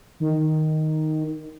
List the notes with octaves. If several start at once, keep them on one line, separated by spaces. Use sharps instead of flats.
D#3